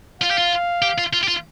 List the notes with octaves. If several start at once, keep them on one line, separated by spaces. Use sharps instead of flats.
F4 F5
G4
F4
G4
F4
F4
G4
F4